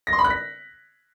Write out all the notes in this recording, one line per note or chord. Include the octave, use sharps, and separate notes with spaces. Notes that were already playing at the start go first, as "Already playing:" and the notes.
A#6
C6
B5
F#6
B6